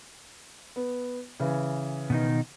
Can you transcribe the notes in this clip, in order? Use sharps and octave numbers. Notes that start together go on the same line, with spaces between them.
B3
C#3 E3
B2 D#3 D#4